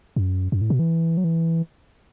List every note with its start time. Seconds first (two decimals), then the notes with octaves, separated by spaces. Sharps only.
0.16 F#2
0.52 F#2
0.61 A2
0.70 B2
0.79 E3
1.17 F#3
1.24 E3